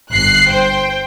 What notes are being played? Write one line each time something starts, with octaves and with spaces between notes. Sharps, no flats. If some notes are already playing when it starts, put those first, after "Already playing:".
G1 F#6 C7
C5 G5